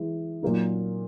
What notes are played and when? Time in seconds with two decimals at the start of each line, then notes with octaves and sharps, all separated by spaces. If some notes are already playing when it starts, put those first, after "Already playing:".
Already playing: E3 G#3
0.43 A#2 F#3 A#3 D#4